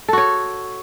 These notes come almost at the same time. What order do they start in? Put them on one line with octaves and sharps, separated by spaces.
A4 F#4 C#5